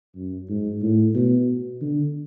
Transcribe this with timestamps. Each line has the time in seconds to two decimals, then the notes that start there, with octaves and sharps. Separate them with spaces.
0.15 F#2
0.49 G#2
0.82 A2
1.15 B2
1.81 D3